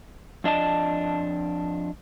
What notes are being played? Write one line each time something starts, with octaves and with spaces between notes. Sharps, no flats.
F2 D4 D#5 A5